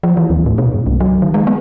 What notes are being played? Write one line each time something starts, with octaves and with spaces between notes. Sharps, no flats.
F3
E3
D#2
A2
B2
G2
C2
F#3
D#3
G#3
B3